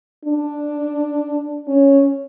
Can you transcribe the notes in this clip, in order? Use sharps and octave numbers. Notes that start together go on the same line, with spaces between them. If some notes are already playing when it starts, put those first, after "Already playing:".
D4
C#4